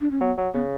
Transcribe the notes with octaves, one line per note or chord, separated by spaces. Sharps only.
D4
C#4
F#3 B3
F#3
C#3 B3